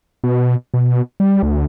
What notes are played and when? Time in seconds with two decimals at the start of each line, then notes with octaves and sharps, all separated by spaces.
0.24 B2
0.74 B2
1.20 G3
1.43 D2